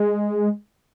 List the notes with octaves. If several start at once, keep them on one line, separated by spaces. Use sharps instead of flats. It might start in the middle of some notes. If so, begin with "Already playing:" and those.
Already playing: G#3